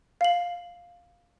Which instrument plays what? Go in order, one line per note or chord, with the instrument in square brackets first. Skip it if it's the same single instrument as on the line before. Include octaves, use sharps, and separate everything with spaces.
[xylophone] F5 C7 F#7